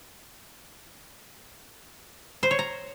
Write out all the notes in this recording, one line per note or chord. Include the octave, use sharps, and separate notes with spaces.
C5
C#5
A#5